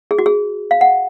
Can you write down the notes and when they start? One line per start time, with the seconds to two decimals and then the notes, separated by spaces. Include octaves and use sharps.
0.11 G#4
0.19 F#4
0.26 G#4
0.71 F5
0.81 F#5